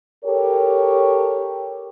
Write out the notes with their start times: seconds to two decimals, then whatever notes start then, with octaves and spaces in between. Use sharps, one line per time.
0.25 G4 A4 A#4 C#5